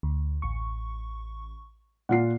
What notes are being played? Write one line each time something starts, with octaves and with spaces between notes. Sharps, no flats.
D2
A1 C#6
A#2 F4 F#5 C7